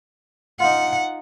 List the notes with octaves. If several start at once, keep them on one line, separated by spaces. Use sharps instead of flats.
D#4 F4 F#5